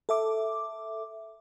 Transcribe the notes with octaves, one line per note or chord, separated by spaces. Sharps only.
A4 E5 D6